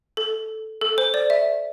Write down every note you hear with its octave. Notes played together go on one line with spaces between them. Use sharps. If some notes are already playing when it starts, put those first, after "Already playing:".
A4
A4
C5
D5
E5